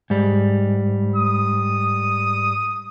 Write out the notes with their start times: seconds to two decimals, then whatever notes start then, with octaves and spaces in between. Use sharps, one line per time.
0.10 G#2 G3
1.16 D#6